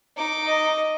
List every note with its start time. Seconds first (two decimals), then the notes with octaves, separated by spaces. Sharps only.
0.16 D#4 D6
0.47 D#5